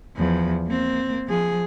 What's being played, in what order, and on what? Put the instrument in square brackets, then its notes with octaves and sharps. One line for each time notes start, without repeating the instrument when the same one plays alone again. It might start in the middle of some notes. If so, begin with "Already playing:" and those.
[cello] E2 F3
A#3 C4
F3 G#4